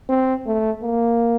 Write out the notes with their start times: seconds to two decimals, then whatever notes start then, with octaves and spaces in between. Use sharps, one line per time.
0.09 C4
0.46 A3
0.82 A#3